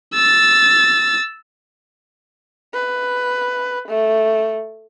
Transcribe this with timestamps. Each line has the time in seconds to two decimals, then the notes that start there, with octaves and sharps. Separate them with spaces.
0.14 E6 A6
2.74 B4
3.88 A3